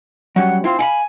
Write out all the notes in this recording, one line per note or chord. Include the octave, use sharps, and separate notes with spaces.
F#3 G3 C#4 F#5
C4 E4 F4 F5
E4 F5 G#5 B5